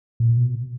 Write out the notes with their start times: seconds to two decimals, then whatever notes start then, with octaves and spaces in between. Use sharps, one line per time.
0.20 A#2
0.37 B2